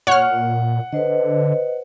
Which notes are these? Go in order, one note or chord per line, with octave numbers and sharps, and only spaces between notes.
A#2 C#5 F#5 F6
D3 B4 C5 D#5